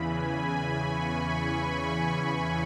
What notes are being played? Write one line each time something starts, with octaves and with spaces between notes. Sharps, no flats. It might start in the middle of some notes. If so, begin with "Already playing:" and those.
Already playing: E2 C#3 E3 G#5 B5
B5
C#6
B5
B5
B5
G#5